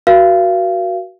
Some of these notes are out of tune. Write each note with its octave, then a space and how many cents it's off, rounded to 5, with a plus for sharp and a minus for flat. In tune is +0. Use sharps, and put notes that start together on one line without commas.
F#4 +10 A#4 +45 F5 -30